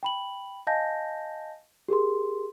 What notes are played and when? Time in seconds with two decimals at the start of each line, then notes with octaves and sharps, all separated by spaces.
0.03 G5 B5 F#7
0.67 D#5 F5 G#5 A5 G6 A#6
1.89 G4 G#4 A#4 C6